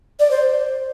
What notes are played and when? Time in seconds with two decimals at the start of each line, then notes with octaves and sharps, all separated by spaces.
0.19 D5
0.31 C5